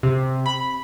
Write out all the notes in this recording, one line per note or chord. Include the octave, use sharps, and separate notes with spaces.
C3
B5